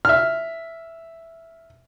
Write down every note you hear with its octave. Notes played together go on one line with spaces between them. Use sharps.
E5 F6